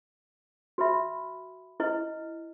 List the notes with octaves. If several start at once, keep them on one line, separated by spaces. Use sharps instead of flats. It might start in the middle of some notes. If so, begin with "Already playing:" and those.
F#4 B4 E5 B5
E4 B4 D#5